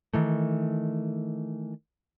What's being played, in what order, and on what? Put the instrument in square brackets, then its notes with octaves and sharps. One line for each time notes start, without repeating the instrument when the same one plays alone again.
[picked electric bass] D#3 E3 A3